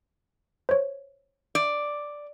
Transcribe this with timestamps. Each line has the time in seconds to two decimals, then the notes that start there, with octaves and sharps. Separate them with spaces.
0.69 C5 C#5
1.55 D5